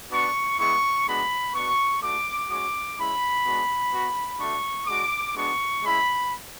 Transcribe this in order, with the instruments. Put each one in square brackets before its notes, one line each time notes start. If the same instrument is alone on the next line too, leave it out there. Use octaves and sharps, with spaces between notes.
[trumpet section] B3 D4 F#4 C#6
G#3 B3 E4 C#6
G#3 B3 D4 F#4 B5
B3 D4 F#4 C#6
A3 D4 F#4 D6
G#3 C#4 F#4 D6
G#3 C#4 E4 B5
G#3 B3 D4 F#4
B3 F#4
A3 D4 F#4 C#6
G#3 D4 F#4 D6
G#3 B3 D4 F#4 C#6
G#3 C#4 E4 B5